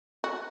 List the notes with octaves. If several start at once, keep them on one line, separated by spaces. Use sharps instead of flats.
F#4